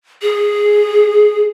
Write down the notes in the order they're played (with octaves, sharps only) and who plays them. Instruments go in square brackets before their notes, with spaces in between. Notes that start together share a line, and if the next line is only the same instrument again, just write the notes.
[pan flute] G#4